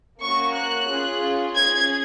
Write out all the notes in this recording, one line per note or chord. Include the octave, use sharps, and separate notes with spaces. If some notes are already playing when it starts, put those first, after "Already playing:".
A#3 C#4 F#4 C#6
F#6
C#4 F4 G#4
C#4 G#4 G#6